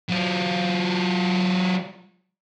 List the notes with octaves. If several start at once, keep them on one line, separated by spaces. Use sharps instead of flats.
F#3 F4